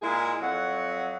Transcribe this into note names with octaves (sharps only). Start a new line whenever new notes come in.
A#2 G#3 E4 G#4
F2 F#3 F#5